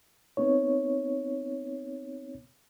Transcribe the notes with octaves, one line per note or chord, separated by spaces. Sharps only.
B3 C4 D#4 C#5